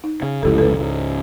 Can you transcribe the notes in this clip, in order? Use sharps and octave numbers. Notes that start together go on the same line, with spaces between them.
D#4
C#3
F1 C#2 E4 G4 A4
A4 B4
C#2 G#2